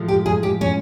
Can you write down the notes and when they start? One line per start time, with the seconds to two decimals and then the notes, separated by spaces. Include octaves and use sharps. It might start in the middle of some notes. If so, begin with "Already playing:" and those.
Already playing: A2 F3 G#3
0.08 G4
0.26 G#4
0.43 G4
0.61 C#4